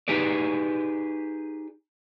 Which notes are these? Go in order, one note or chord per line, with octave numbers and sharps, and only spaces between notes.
D#4 G4 G#4 B4 D5